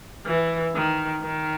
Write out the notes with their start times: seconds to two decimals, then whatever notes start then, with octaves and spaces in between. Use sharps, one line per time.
0.26 E3
0.75 D#3
1.22 D#3